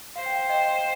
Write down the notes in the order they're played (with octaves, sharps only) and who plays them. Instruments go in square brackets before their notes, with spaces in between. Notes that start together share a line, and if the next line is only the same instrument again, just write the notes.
[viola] C5 [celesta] F5
[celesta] G5
F5
D#5 G5